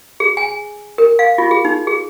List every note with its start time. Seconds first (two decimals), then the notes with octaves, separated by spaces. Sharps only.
0.20 G#4
0.37 G#5
0.98 A#4
1.19 F5
1.38 F4
1.51 G#4
1.65 D#4
1.87 G#4